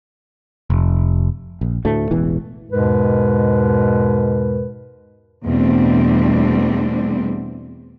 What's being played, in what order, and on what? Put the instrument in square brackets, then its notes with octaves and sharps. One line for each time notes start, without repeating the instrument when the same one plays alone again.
[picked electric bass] F1
[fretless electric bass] A#1
D2 A2 A3
E1 A1 E2 E3
[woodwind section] E2 G#2 B2 G#3 A#4 B4
[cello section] E2 B2 G3 A3 C4 D4